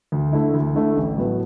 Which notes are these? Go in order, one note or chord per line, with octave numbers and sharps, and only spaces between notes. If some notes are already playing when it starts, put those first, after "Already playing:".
D2
D3 A3 E4
D2
D3 A3 E4
A1
A2 F#3 B3